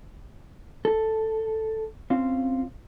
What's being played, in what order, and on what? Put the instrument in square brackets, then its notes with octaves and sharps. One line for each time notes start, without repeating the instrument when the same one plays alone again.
[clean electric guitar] A4
C4 C#4 F4